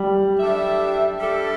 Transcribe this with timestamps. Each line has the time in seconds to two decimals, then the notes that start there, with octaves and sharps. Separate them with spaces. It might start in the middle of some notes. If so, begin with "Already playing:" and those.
Already playing: G3
0.39 G3 D4 A4 E5
1.19 G3 D4 A4 E5